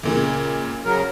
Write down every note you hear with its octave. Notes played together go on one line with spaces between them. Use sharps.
C#2 A#2 C#3
C#3 F#3 A#4